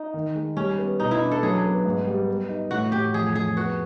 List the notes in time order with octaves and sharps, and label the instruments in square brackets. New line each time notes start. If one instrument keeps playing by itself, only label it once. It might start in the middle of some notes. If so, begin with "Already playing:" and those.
Already playing: [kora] D#4
[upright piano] D#3
G#3
[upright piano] G3 [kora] C#4
[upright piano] B3
[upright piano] B2 [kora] D#4
[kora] E4
[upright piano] D4
[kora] A4
[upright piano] F#3 [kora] G#4
[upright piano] B3
G#2
G3
B3
D#4
[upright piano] A2 [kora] F#4
[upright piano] A2 [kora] G4
[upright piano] F2 [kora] G#4
[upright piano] F2 [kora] G#4
[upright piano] B3 [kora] F#4